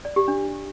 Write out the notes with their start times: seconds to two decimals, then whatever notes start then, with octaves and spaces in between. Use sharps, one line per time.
0.05 D5
0.16 G4
0.28 D4